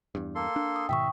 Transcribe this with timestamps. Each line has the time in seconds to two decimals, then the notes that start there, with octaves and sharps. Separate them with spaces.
0.15 E2 G2
0.35 A#3 A4 C6
0.56 D4
0.76 D#6
0.89 G#2 B2 D#3 E5 G5 C#6